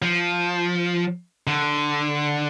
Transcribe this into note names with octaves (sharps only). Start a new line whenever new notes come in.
F3
D3